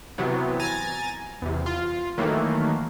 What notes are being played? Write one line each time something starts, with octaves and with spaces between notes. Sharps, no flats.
C3 E3 F#3 B3
G#5 A#5 A6
E2 C3
F4
D#3 E3 F#3 A3 A#3